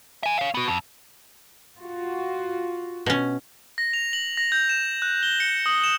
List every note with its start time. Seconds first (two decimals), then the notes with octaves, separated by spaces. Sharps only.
0.23 E5 G#5
0.39 C#5 F5
0.54 B3 F#4
0.68 F2
1.81 F4 F#4
3.06 B2 C#4
3.78 A#6
3.93 F7
4.13 F#7
4.37 A#6
4.52 G6
4.69 E7
5.02 F#6
5.23 G7
5.40 C#7
5.66 D#6
5.84 E7